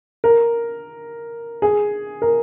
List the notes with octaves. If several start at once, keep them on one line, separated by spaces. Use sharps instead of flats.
A#4
G#4
A#4